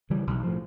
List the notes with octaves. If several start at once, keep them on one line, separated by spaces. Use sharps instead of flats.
C#3 E3 G3
B1
A2 F3